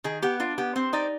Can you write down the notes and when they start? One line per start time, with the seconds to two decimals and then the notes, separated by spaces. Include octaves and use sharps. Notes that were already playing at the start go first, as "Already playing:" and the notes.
0.04 D#3 G#4
0.22 B3 G4
0.40 D4 F4
0.58 B3 G4
0.76 C4 C5
0.93 D#4 D5